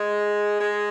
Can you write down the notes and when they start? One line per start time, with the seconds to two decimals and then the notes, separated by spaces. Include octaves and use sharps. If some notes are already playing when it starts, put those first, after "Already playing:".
Already playing: G#3
0.60 G#3